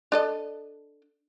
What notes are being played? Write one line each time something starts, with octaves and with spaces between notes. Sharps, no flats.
D4 A4 D#5